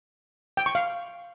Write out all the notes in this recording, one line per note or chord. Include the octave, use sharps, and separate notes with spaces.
G5
C#6
F5